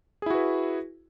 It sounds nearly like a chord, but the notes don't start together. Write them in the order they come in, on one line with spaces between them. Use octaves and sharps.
G#4 E4 F#4 B4